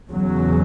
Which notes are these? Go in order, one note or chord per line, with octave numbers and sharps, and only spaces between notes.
E2 C#3 F#3